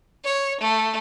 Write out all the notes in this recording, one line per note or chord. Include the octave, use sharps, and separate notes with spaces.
C#5
A3